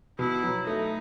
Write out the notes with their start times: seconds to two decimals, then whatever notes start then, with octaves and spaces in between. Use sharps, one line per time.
0.19 B2 E4
0.43 F#3
0.67 A3 D#4